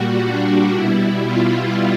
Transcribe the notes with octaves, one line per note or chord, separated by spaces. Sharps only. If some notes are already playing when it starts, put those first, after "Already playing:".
Already playing: A#2 G3 F#4
D4
B2 G3 E4
F4